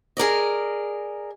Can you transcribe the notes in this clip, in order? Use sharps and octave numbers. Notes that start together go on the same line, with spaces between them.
G#4 A#4 D5 D#5